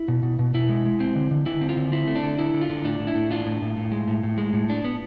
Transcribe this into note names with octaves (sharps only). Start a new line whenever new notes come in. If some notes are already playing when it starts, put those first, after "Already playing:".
Already playing: E4
B2
B2
B2
B2 E4
G#3
G#3
C4
D3
D3
D3 E4
C4
F4
D3
C4 E4
A3
D4
D3
D3 E4
D3
F4
D3
A2 D4
A2
E4
A2
D4 F4
A2
A2
A2
G#3
A2
A2
G#3
A2
D4
B3